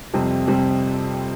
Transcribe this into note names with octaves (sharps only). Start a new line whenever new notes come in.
F2 C3 G3 C4
C3 G3 C4